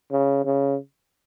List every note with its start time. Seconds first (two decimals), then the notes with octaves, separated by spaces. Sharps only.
0.11 C#3
0.45 C#3